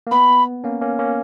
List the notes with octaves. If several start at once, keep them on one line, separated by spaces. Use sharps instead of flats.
A#3
B3 B5
A#3 C#4
A#3 C#4
A#3 C#4